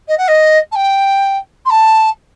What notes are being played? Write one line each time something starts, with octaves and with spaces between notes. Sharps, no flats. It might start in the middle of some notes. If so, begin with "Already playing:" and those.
D#5
F#5
D#5
A5
G5
C6
A5